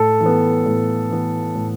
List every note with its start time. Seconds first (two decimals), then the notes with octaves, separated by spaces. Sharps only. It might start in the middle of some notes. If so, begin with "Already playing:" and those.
Already playing: A2 A4
0.20 E3
0.26 B3
0.66 A2
1.10 E3 B3
1.55 A2